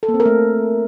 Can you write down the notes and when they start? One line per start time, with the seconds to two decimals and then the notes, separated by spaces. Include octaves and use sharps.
0.03 A4
0.08 A#3
0.14 C4
0.20 A#4
0.26 A3